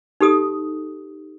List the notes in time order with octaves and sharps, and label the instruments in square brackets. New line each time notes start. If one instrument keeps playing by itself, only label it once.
[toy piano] D#4 G4 A4 D#6